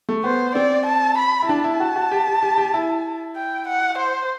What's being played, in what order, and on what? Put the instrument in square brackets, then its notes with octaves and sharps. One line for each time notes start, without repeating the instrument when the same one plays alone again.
[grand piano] A3
[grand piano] B3 [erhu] C5
[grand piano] C4 [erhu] D5
[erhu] A5
B5
[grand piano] E4
[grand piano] D4 [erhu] A5
[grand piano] E4
F#4
F#4
G4
G4
G4
G4
E4
[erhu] G5
F#5
C5